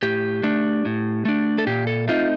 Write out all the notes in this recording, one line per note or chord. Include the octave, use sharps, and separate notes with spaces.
A2 G4
A3 D4
A2
A3 D4
A4
A#2 G4
A4
A3 C4 D#4 F4